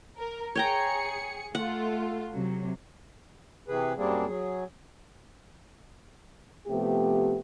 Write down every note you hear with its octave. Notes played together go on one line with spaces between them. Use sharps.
A#4
G#4 C#5 G5 A#5 C#7
A3 F4 F#5
C3 F#3
C3 E3 G#4 B4
F#2 G3 A#3 C4 D4 G#4
F#3 G#4
C3 F3 A3 B3 G4